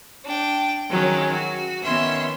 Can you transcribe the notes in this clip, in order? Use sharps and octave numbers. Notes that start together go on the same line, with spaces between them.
D4 G5
D#3 F#3 G#3 C#4
F#4
D#3 B3 C#4 E5 C6